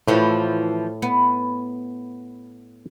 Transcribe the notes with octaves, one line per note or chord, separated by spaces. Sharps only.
A2 E3 F3 A3
B3